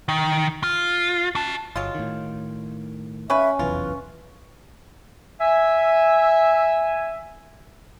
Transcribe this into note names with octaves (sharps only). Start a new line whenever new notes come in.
D#3
F4
F#4 A5
G1 F#3 G#3 F4
A2 D#3
C#3 C#4 B4 E5
F1 B1 E2 F4 B4
E5 G#5